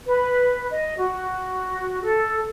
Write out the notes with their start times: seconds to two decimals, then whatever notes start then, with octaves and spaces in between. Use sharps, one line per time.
0.05 B4
0.71 D#5
0.98 F#4
2.02 A4